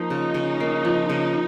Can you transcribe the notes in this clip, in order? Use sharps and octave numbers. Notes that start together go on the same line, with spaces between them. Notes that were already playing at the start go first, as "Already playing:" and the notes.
Already playing: F3 A#3 D#4
C#3
C#3
A#3
F3
C#3